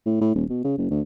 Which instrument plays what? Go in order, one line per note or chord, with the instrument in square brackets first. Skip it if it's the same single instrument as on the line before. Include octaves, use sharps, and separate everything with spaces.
[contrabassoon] A2
A2
D#1
B2
C#3
F#1
D2